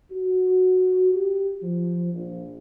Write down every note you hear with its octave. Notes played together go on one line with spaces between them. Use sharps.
F#4
G4
F3
A#1